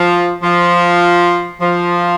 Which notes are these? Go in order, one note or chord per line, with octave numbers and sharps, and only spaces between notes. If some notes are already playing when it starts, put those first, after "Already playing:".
Already playing: F3
F3
F3